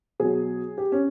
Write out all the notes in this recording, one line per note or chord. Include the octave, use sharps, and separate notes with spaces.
B2 F#3 G#4
G4
C#4